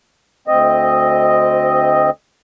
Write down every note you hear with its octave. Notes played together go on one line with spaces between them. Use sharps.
D2 C4 D#5